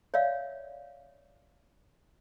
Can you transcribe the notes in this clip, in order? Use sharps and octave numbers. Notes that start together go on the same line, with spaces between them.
C#5 D5 E5 F5